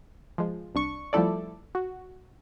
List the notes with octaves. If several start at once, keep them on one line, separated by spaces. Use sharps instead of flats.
F3 G#3
C2 D4 C#6
F3 G3 A3 E4 A4 D5
F#4